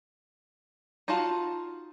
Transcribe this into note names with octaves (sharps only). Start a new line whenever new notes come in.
D#4 F4 F#4 F5 A5